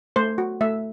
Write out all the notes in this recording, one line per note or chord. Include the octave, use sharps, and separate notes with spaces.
A3 C5
F#4
A3 E5